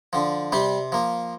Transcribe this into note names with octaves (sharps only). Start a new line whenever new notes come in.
D3 F3
C3 G3 G4
F3 A#3